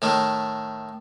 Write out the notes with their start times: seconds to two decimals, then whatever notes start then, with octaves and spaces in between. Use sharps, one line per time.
0.02 A2 D#3 A3